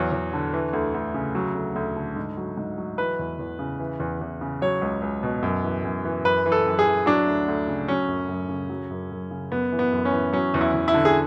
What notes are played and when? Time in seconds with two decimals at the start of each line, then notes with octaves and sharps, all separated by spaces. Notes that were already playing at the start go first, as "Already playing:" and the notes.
Already playing: E2 F#3 C#5
0.12 E2
0.33 D3
0.54 E3
0.73 D2
0.94 D2
1.14 C#3
1.35 F#3
1.55 D2
1.75 D2
1.96 D3
2.16 G#2
2.37 F#3
2.57 G#2
2.78 F#3
2.98 E3 B4
3.19 E2
3.39 E2
3.59 C#3
3.80 E3
4.00 E2
4.21 E2
4.41 C#3
4.61 F#3 C#5
4.82 C#2
5.02 C#2
5.23 B2
5.43 F#2
5.64 E3
5.84 F#2
6.05 E3
6.25 F#2 B4
6.46 E3
6.52 A4
6.66 F#2
6.79 G#4
6.85 E3
7.06 F#3 D4
7.27 D2
7.48 D2
7.67 C#3
7.88 F#3 C#4
8.08 F#2
8.29 F#2
8.49 C#3
8.69 F#3
8.90 F#2
9.11 F#2
9.31 C#3
9.52 F#2 B3
9.72 E3
9.79 B3
9.92 F#2
10.05 C#4
10.12 E3
10.33 F#3 C#4
10.54 E2
10.61 E4
10.74 E2
10.88 E4
10.94 D3
11.05 G#4